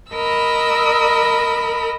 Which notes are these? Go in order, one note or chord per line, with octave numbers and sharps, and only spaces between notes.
A#4 D#5 B5 E6